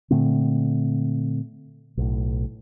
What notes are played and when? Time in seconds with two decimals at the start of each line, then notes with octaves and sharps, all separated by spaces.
0.11 A#2 D3 A3 C4
1.97 B1 A2